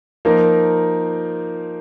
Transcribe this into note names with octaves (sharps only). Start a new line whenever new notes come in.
F3 A#3 D#4 A#4